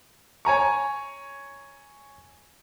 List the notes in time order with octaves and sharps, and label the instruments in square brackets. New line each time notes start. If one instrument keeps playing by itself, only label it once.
[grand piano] C#5 G#5 A#5 C#6